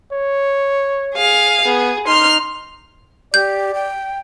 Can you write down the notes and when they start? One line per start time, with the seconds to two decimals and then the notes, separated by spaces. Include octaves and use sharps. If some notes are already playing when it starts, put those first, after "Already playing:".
0.13 C#5
1.15 G#4 F5
1.65 B3 G#4
2.07 D#4 C6 F6
3.34 G4 D5 G6
3.75 G5